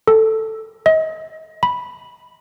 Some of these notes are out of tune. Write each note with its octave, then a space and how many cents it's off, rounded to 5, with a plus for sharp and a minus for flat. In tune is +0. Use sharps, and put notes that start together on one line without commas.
A4 +5
D#5 +35
B5 -5